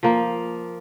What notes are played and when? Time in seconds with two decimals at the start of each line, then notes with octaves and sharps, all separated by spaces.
0.03 F3 A#3